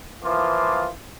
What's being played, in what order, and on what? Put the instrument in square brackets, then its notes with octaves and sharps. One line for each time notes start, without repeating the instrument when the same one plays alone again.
[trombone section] E3 F3 A#3 F4